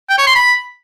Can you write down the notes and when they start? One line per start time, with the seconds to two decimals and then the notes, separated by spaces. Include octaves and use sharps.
0.10 G5
0.18 C#5
0.27 C6
0.35 B5